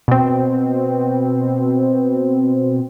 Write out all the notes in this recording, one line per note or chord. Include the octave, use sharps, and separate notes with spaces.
B2 C4